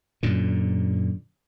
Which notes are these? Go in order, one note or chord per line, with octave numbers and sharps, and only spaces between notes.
F#2 A#2 D3